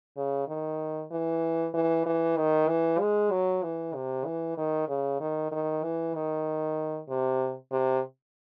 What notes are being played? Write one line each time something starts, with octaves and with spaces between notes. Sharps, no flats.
C#3
D#3
E3
E3
E3
D#3
E3
G#3
F#3
E3
C3
E3
D#3
C#3
D#3
D#3
E3
D#3
C3
C3